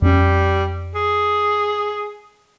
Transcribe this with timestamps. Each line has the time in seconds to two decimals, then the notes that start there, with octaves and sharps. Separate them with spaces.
0.02 F2 G3 A#3 C#4
0.95 G#4